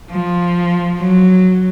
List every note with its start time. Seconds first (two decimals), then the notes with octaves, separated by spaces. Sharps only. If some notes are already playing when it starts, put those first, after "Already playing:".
0.11 F3
1.00 F#3